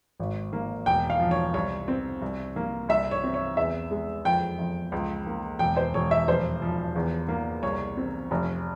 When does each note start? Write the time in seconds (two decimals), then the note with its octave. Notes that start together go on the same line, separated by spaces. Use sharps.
0.19 G#1
0.53 A#3
0.86 E1 G5
1.10 F5
1.20 F3
1.31 C#5
1.54 C2 C#5
1.88 C4
2.22 C2
2.56 A#3
2.89 C2 E5
3.11 C#5
3.23 C4
3.34 C#5
3.57 E2 E5
3.91 G#3
4.25 F2 G5
4.59 F2
4.92 C#2
5.27 A#3
5.59 E1 G5
5.77 C5
5.94 E1 C#5
6.11 E5
6.27 F1 C5
6.62 F3
6.95 E2
7.28 A#3
7.63 C2 C#5
7.97 C4
8.31 F1